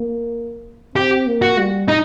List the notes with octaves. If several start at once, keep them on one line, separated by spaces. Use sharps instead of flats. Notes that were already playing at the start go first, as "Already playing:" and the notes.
Already playing: A#3
C4 G4
A#3
F#4
G3
D#4